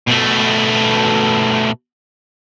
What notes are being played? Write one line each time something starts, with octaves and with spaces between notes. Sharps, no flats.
B2 A3